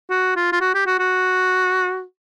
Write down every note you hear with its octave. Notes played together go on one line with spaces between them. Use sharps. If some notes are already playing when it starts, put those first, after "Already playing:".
F#4
F4
F4
F#4
G4
F#4
F#4